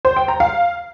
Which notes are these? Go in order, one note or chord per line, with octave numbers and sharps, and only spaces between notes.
C5
G5
A#5
F5